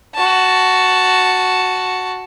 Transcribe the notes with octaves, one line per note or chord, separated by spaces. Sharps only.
F#4 A5